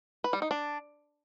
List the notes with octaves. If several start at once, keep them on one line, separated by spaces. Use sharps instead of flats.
B4
G3
D#4
D4